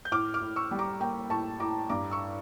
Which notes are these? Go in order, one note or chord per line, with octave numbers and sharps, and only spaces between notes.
G6
A2 D6 F6
D6 F6
A2
C#6 E6
G3
A#5 D6
A#3 G5 A#5
A2 A5 C#6
A2 A#5 D6
G2 A#5 D6
C#6 E6